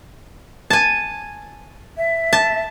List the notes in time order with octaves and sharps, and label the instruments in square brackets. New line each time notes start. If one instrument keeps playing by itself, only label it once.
[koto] G#5 A5
[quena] E5
[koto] A5